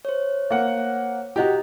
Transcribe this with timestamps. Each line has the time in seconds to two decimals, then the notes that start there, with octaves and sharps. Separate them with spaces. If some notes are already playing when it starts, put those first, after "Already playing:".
0.05 C5 C#5
0.51 A#3 F#5
1.36 E4 F#4 G4 D#5 A#5